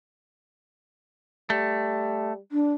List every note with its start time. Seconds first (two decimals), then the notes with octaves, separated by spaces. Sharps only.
1.50 G3 A3
2.52 D4